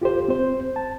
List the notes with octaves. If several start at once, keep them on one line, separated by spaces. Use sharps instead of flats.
F4 G4 A4 C5
C4 C5
A5